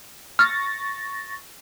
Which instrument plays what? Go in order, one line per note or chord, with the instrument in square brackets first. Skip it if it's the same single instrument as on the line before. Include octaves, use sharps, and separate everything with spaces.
[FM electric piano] C#6 A6 A#6 [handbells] F6